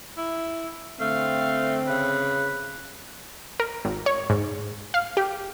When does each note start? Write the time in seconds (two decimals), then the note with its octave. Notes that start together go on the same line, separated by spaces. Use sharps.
0.17 E4
1.00 D3 A3 C4 F5
1.87 C#3 B4
3.60 A#4
3.85 G#1
4.06 C#5
4.30 G#2
4.94 F5
5.17 G4